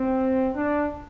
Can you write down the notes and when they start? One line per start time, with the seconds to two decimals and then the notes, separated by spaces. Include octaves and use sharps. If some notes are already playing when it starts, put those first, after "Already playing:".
Already playing: C4
0.54 D4